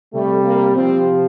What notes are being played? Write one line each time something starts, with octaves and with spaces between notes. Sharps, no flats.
C3 G3 A3
A#3
C3 F3 C4